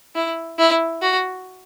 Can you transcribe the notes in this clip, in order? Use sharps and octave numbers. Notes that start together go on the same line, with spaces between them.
E4
E4
F#4